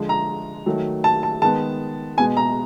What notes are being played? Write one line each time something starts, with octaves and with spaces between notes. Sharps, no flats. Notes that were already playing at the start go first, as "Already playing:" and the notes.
Already playing: D3 F3 G#3
A#5
D#3 F#3 A3
A5
A5
D#3 G#3 B3 A5
B2 G#3 B3 G#5
A#5